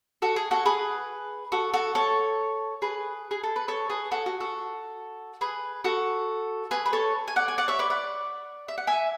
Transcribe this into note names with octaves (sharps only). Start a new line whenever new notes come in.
F#4 A4
G#4
F#4 A4
G#4 B4
F#4 A4
F#4 A4
A4 C#5
G#4 B4
G#4
A4
B4
A4 C#5
G#4 B4
F#4 A4
F#4
F#4 A4
G#4 B4
F#4 A4
G#4 B4
B4
A4 C#5
G#5
D5 F#5
G#5
D5 F#5
C#5 E5
B4 D5
D5 F#5
E5
F#5
E5 G#5